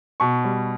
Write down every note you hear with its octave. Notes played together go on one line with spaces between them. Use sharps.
B2 C#6
G3